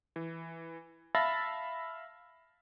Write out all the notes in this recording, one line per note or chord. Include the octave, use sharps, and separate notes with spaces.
E3
E5 F5 A5 B5 A6 A#6